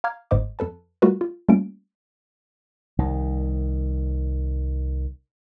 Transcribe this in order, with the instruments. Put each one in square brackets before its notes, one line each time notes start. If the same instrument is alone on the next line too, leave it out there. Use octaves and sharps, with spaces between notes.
[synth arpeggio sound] F5 A#5 D6 F6 G#6
G1 G#2 C5 D#5 D6
F2 A4 B4 A5
G3 A3 F4 F#4 A#4 B4
F4
G3 A3 A#3 C#4 F4 D7
[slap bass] C2 D#3